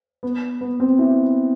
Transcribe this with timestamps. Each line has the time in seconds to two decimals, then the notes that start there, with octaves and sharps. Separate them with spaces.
0.23 B3
0.61 B3
0.80 C4
0.99 E4